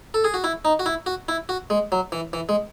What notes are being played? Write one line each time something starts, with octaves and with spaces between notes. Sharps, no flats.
A4
G#4
F#4
E4
D#4
F#4
E4
F#4
E4
F#4
G#3
F#3
E3
E3
G#3